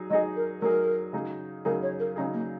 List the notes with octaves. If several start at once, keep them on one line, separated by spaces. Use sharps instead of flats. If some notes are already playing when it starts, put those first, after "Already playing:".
Already playing: F#3 D#4 G#4
F#3 D#4 G#4 D#5
A#4
F#3 D#4 G#4 A#4
C#3 F#3 D#4 G#4
C#3 F#3 D#4 G#4 A#4
C#5
A#4
C#3 F#3 C#4 D#4 G#4
A#3